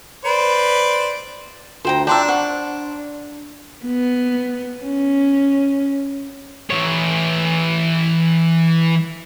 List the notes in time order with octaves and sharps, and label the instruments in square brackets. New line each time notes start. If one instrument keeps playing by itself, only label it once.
[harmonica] B4 C5 D5
[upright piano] D2 [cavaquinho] C5 G5 A#5
[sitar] D4 [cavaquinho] E5 G5 [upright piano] A#5 C6
[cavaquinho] C5 F#5 C#6
[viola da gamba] B3
C#4
[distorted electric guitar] E3 C#5